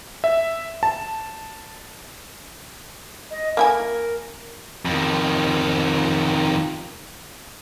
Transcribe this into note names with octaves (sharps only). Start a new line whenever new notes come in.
E5
A5
D#5
A#3 E4 A#4 G#5
F2 D#3